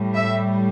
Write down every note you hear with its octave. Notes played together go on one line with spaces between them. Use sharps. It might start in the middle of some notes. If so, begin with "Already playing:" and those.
Already playing: A2 G3
E5